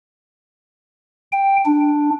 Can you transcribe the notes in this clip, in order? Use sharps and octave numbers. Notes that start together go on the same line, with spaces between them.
G5
D4